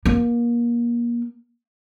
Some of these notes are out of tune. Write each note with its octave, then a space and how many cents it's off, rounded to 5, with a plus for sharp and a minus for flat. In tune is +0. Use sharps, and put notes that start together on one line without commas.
A#3 +30